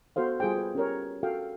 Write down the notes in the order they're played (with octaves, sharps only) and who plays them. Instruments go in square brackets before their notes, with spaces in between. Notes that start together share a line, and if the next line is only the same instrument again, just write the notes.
[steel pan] B3 F#4 A4 C5 F5
G3 F4 G#4 C5 G5
B4
C#4 G4 A#4 C#5
F#4 A4 F5 G5